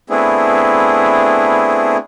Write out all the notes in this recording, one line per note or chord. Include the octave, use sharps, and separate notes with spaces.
A3 B3 C4 D4 E4 G#4